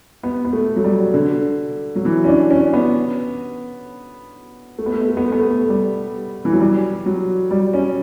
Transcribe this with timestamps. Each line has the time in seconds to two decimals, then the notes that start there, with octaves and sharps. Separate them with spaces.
0.23 B3
0.45 B3
0.53 A3
0.76 F#3
0.84 G3
1.14 D3
1.96 F#3
2.05 E3
2.24 C#4
2.28 D4
2.50 C#4
2.73 B3
4.79 A3
4.86 B3
4.94 A3
5.01 B3
5.09 A3
5.17 B3
5.24 A3
5.32 B3
5.40 A3
5.69 G3
6.45 E3
6.53 F#3
6.60 G3
7.06 F#3
7.51 G3
7.73 C#4